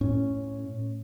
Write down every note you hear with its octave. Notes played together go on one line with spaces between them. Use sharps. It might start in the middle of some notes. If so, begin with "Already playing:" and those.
A2 C#4